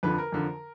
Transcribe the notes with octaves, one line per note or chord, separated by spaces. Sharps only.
F2 D3 F3 B4
A#4
F2 D3 F3